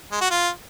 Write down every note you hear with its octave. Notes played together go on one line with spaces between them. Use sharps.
G#3
F#4
F4